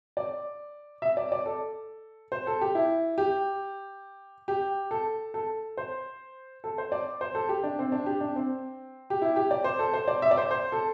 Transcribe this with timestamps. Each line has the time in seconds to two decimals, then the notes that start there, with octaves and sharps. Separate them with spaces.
0.17 D5
1.02 E5
1.17 D5
1.32 D5
1.46 A4
2.32 C5
2.47 A4
2.61 G4
2.75 E4
3.18 G4
4.48 G4
4.91 A4
5.34 A4
5.77 C5
6.64 A4
6.78 C5
6.92 D5
7.21 C5
7.35 A4
7.49 G4
7.64 D4
7.79 C4
7.92 D4
8.06 G4
8.21 D4
8.36 C4
9.10 G4
9.22 E4
9.36 G4
9.51 D5
9.64 C5
9.79 A4
9.94 C5
10.08 D5
10.22 E5
10.31 D5
10.37 C5
10.51 C5
10.72 A4